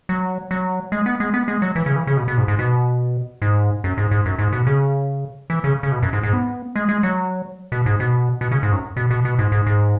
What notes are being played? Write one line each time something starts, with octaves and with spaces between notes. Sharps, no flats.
F#3
F#3
G#3
B3
G#3
B3
G#3
F#3
E3
C#3
E3
C#3
B2
B2
G#2
G#2
B2
G#2
F#2
G#2
G#2
F#2
G#2
B2
C#3
E3
C#3
C#3
B2
F#2
G#2
G#2
B3
G#3
G#3
F#3
B2
G#2
B2
B2
C#3
G#2
F#2
B2
B2
B2
G#2
G#2
G#2